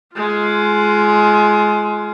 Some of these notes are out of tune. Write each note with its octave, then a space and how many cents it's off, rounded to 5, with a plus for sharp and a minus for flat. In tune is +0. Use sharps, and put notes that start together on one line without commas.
G#3 +20 F4 -10